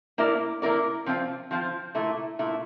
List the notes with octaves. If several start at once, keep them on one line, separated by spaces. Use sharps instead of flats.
A#3 E4 A#4 D5
A#3 E4 A#4 D5
F3 C4 F4
F3 C4 F4
A#2 A3 E4
A#2 A3 E4